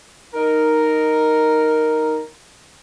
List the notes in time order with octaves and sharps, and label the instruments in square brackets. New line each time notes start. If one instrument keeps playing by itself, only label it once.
[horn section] D#4 A#4